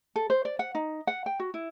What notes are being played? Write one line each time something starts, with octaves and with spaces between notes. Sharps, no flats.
A4
C5
D5
F#5
D#4
F#5
G5
F#4
E4